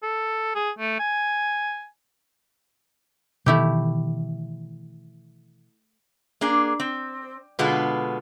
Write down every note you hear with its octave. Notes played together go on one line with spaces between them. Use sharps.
A4
G#4
A3
G#5
B2 D#3 E3 A3 E4 G4
A#3 D4 G#4
C4
B2 D3 G#3 B3 F4